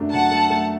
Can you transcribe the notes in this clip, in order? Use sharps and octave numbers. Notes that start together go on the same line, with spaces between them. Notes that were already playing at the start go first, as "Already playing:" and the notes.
Already playing: F#2 F#3 A3 D4
F#3 F#5 A5
A3
A3